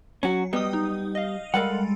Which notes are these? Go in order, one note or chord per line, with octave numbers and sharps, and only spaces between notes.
F#3 C#4 F#4
G3 B3 D#5 G5 D#6
D#4
D#5 F5
G3 G#3 A4 A#4 F5 F#5